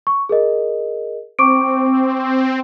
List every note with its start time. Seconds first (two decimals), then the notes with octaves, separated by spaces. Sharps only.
0.07 C#6
0.29 G#4 A#4 D#5
1.39 C4 C#6 D6 D7